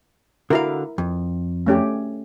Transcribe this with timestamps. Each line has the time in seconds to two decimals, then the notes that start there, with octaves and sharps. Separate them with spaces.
0.50 D3 E4 F#4 A#4 F5
0.98 F2
1.67 A3 C#4 G4